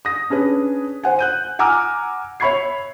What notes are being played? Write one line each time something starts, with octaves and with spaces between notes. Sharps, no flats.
D#6 A#6
C#4 D4 G#4 B4
C5 F#5 G#5
F#6 G6 D#7
F#5 G#5 A#5 D6 E6 F6
C#5 E5 B5 C#6 G#6 C7